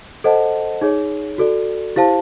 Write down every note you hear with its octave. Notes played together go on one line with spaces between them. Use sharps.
A4 C5 D#5 F#5 A5
D#4 G#4 C#5
F#4 A4 D5
E4 G4 C5 F5 A5